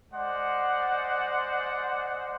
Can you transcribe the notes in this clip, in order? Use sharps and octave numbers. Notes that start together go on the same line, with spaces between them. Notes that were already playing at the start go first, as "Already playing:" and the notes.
G#3 C5 D5 F#5